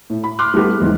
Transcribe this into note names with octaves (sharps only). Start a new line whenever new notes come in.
A2
B5
C6 D6 F6 F#6
G3 A3 B3 G4
B1 E2 G#2